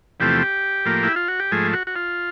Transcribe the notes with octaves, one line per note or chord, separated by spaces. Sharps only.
E2 C3 F3 A3 G4
A2 F3 A#3
E4
F4
F#4
G4
G#2 F3 A3 G#4
F#4
F#4
F4